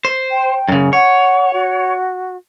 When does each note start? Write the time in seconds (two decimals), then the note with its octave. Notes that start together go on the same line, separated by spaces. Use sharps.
0.05 C5
0.31 G5
0.68 F#2 C#3
0.93 C#5 F#5
1.53 F#4